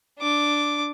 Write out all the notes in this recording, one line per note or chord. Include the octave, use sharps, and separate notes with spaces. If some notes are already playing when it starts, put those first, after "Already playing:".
D4 D6